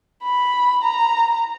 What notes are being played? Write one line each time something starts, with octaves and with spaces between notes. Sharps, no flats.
B5
A#5